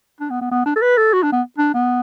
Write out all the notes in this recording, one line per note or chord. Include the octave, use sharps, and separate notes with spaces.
D4
B3
B3
B3
D4
A4
B4
A4
F#4
D4
B3
D4
B3